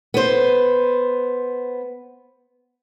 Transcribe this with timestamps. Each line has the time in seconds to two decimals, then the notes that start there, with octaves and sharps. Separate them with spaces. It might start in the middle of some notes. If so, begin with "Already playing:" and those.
0.14 B3 C5